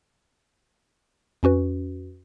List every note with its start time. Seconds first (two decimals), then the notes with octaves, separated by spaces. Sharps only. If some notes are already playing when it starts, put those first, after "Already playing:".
1.43 F2 C#4 F#4 B4